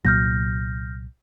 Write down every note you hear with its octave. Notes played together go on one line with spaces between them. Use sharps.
C2 A#2 F#3 F6 G6 A#6